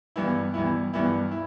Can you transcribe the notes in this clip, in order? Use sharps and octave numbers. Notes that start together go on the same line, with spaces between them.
G2 E3 B3 E4
G2 E3 B3 E4
G2 E3 B3 E4
E4